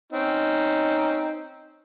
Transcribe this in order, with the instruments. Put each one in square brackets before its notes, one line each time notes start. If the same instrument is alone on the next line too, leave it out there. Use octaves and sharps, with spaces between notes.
[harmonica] C4 C#4 [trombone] D#4